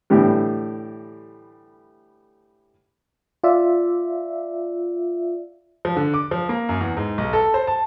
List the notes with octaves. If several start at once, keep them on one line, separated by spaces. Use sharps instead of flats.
A2 D3 E3 G3 G4
F4 D5 E5
F3
D3
D6
F3
A#3
F#2
E2
G#2
B1
A4
C5
A5